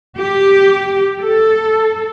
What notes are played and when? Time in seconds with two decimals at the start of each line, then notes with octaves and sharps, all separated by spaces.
0.17 G4
1.20 A4